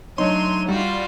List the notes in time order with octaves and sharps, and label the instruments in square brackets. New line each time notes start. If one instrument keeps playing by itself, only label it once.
[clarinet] F#3 [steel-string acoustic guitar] A3 D4 D#4 [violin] C#5 D#7 [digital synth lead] C6
[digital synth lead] G3 [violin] F4 F#4